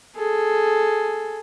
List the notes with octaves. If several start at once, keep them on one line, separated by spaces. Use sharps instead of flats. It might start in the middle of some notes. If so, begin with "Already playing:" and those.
G#4 A4